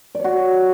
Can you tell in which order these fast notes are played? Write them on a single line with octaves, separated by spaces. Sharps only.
D5 C#5 F#4